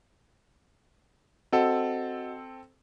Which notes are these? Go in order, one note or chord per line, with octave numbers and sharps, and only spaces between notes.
C4 F#4 A4 D#5 F#5